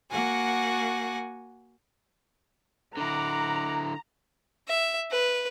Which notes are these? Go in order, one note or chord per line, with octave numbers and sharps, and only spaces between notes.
A#3 F#4 F#5 G#5
D3 E4 F#5 A#5 D6
E5
B4